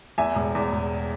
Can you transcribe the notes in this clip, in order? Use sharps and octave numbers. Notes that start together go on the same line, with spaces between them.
E2 E5 G#5
E1
E2
E1